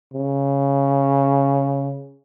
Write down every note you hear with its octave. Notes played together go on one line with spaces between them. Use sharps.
C#3